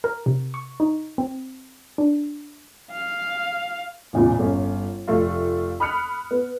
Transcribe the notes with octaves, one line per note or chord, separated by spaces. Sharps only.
A#4
C3
C#6
D#4
C4
D4
F5
A1 E2 A#2 C#3
G1 C#4
F1 F3 A3 F4
B5 D#6 F6 F#6 C#7
B3